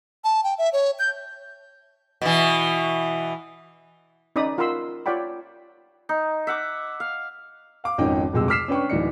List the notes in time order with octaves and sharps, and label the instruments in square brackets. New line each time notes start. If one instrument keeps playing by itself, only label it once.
[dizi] A5
G5
E5
C#5
G6
[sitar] B2 E3
[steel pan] C#4 D#4 D5 B5 D#6
F4 A#4 F#5 B5 C6 E6
F4 C#5 D5 F#5 G5 B5
[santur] D#4
E5 F#5 D6
F5
[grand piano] F5 D6
G#1 F2 C#4 D#4 G5
D1 F2 C3 G#3 G#4 E6
D6 E6 F6 B6 C7 E7
C#4 D4 B4 G5 C#6
D1 E3 D#4 D5 C#7